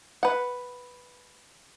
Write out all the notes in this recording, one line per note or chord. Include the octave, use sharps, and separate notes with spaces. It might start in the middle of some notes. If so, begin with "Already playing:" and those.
B4 F#5